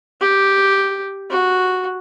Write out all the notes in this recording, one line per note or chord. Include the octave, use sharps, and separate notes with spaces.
G4
F#4